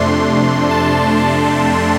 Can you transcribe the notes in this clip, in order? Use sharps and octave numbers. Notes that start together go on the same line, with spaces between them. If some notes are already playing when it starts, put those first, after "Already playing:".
Already playing: F2 C3 A3 D4 C6
A5